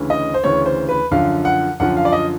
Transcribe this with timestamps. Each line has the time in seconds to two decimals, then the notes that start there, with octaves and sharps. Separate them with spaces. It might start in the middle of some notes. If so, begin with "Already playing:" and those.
Already playing: D2 C#3 E3
0.10 D#5
0.34 C5
0.44 D2 C#3 E3 C#5
0.66 C5
0.89 B4
1.11 F#2 D3 F3 F5
1.45 F#5
1.80 F#2 D3 F3 F#5
1.97 F5
2.05 D5
2.12 D#5